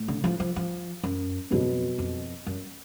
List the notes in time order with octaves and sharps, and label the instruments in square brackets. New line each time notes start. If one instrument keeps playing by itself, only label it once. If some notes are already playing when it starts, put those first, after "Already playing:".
Already playing: [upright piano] A2
[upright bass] D3
F3
F3
F3
F#2
[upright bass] F2 [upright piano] B2 F#3 B3
[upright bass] F2
F#2